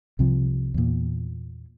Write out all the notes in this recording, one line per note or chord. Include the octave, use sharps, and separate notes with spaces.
C2 C3 F3
E2 A#2